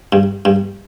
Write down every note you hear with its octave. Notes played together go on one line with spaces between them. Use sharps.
G2
G2